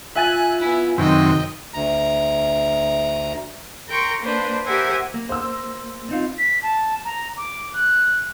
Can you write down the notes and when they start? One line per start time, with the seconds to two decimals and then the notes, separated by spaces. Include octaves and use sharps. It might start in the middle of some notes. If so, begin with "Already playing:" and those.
0.16 F4 E5 G#5 F#6 A6
0.60 B3 E4
0.98 F#2 C3 D#3 D#5 G5
1.74 D2 A#5
3.88 A#4 G5 A#5 C6 C#6
4.21 A#3 D4 B4 C5
4.65 G4 A#4 C5 E5 F#5 G#5
5.14 A#3
5.29 C5 E6
6.09 C4 D#4 F4
6.38 B6
6.63 A5
7.05 A#5
7.37 D6
7.74 F#6